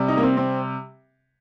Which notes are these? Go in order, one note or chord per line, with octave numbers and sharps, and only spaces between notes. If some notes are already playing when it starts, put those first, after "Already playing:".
Already playing: C3 G3
D#4
A#3
C4
C4